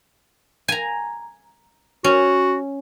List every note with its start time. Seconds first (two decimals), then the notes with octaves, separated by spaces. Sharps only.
0.68 G#5 A#5
2.04 C#4 F#4